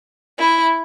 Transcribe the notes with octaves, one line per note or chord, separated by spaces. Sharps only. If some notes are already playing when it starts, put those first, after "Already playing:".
E4